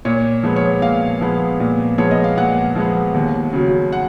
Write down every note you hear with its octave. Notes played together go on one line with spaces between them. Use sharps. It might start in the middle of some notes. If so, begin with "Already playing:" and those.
A#2 C#5
F3 G#3 B3
C#5
A#2 F5
F3 G#3 B3
A#2
F3 G#3 B3 C#5
D#5
F5
A#2 F#5
F3 G#3 B3
D#2
C#3 F#3
F#5